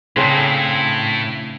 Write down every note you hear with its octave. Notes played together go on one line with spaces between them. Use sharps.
A2 C#3 C4 D4